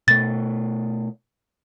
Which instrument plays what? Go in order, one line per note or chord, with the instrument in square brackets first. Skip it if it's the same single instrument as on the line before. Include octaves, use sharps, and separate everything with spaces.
[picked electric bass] B2 A3 [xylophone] A6